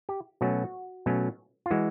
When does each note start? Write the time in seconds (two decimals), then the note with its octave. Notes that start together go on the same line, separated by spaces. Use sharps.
0.09 G4
0.41 B2 F#3 A3 C#4 F#4
1.06 B2 F#3 A3 C#4
1.66 F4
1.71 E3 G#3 F#4